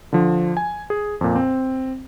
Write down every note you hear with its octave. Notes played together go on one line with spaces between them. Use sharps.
D3 F3 D4
G#5
G#4
F2 A#2
C4